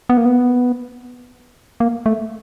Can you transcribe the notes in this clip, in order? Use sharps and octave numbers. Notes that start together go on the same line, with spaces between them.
B3
A#3
B3
A#3
A3